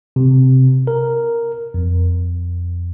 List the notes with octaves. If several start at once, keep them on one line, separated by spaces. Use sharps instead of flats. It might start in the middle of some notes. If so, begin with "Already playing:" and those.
C3
A#4
F2